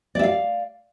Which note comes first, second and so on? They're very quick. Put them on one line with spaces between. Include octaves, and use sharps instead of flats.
D5 E5 F5